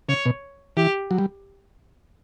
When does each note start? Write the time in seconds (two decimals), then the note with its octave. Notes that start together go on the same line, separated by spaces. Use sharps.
0.09 C#3 C#5
0.26 B2
0.77 E3 G4
1.11 F#3
1.18 G3